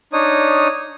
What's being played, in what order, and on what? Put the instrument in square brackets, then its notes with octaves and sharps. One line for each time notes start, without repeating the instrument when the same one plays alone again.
[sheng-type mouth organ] D4 D#4 C#5 D#6